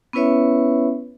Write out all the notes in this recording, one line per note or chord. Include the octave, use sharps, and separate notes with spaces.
B3 C#4 E4 B4 C#5 E5